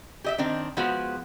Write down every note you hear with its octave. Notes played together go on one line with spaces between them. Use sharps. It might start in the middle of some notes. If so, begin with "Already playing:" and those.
G4 D#5 E5
D#3 C4 D4
F3 G#3 B3 F#4